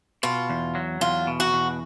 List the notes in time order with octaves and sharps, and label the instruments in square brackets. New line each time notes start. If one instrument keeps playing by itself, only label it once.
[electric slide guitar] B2 [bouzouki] F4
[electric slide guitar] E2
F#3
[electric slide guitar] E2 [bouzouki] F4
[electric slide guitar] B2
[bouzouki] F#4
[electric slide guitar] E2